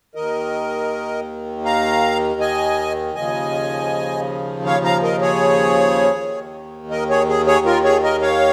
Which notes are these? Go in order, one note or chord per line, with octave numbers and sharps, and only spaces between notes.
D#2 D#3 A#4 D#5
F5 A#5
D#5 G#5
D#2 C#3 F3 D#5 G#5
C#5 F5
F5 A#5
A#4 D#5
G#4 C#5
D#2 D#3
A#4 D#5
G#4 C#5
G#4
G#4 C#5
F4 A#4
G#4 C#5
A#4 D#5
C#5 F5